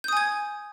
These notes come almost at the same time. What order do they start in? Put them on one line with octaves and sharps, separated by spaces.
G6 D#6 G#5 G#6